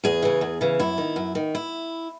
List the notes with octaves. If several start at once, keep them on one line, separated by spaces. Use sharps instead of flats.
E2 G#4
C#3 E3
E2
C#3 E3
F#2 E4
D#3
F#2
D#3
E4